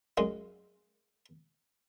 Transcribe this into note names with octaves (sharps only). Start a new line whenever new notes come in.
F#2 G#3